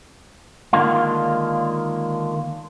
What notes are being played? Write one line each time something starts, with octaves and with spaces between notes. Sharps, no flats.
D3 D#3 G#3 A#3 D4 F4